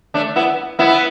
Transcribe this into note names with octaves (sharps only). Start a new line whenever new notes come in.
A3 D4
B3 E4
B3 E4